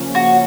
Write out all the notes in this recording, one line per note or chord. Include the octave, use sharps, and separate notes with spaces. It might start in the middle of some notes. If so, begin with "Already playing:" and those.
Already playing: C#3 F3 A#3 C#4
F#4